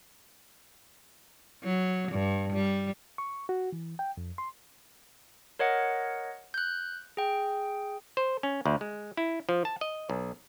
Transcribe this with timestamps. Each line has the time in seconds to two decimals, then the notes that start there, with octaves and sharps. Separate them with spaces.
1.64 F#3
2.12 G2
2.53 G3
3.18 C#6
3.49 F#4
3.73 E3
3.99 G5
4.17 F2
4.38 C6
5.59 A#4 C#5 D#5 F#5
6.54 F#6 G6
7.17 G#4 G5
8.17 C5
8.43 C#4
8.66 D2
8.81 G#3
9.17 E4
9.49 F3
9.65 A5
9.81 D#5
10.10 B1